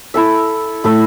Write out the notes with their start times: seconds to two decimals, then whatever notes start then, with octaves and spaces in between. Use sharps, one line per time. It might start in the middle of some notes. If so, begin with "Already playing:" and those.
0.14 E4 A4 E5
0.84 A2 E4 A4 E5